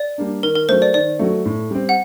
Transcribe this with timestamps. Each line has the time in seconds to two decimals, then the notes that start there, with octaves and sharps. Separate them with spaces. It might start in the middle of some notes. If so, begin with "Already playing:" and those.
Already playing: D5
0.18 G3 A#3 D4
0.43 D#3 A#4
0.55 A#4
0.69 F#3 A3 C5
0.82 D5
0.94 D#3 D5
1.19 F#3 A3
1.45 A2
1.71 G3 C4
1.89 F#5